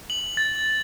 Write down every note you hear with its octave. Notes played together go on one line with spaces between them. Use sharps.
F#7
A6